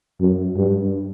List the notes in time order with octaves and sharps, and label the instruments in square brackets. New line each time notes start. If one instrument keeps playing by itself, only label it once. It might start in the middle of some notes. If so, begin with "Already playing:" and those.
[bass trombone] F#2
G2